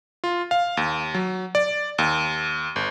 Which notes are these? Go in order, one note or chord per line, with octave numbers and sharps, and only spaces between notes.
F4
F5
D#2
F#3
D5
D#2
G1